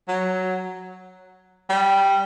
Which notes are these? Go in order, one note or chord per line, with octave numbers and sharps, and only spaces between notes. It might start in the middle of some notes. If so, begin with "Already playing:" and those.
F#3
G3